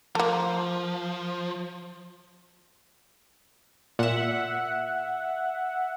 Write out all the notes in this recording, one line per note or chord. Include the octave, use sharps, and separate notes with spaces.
F3 A3 A#3
A#2 E5 F#5 E7